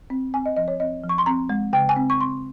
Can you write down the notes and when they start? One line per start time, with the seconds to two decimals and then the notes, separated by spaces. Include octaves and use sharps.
0.10 C4
0.34 C4 G#5
0.46 D#5
0.57 F3 D#5
0.68 C#5
0.80 C4 D#5
1.03 F3
1.09 C#6
1.18 C6
1.26 C4 A#5
1.49 G#3
1.73 C#3 G5
1.89 G#5
1.96 C4
2.10 C#6
2.21 C4 C6